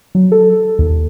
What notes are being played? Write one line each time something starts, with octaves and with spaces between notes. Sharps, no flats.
F#3
A4
D#2